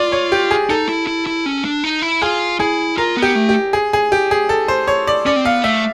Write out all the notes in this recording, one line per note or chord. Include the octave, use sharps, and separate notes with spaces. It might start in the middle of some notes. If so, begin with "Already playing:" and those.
Already playing: F4 D5
C#5
G4
G#4
D#4 A4
E4
E4
E4
C#4
D4
D#4
E4
F4 G#4
E4 G#4
F4 A#4
B3
G4
A3
G4
G#4
G#4
G4
G#4
A4
C5
C#5
D5
C#4 D5
C4
B3 F5
A3 E5